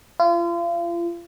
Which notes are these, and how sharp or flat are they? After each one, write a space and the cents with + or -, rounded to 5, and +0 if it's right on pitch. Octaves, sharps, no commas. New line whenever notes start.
F4 -35